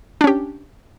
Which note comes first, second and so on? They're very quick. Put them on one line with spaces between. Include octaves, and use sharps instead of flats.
D4 C#4 G4